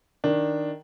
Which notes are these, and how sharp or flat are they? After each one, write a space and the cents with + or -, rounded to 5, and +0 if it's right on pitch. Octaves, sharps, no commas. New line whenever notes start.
D#3 +0 D4 +0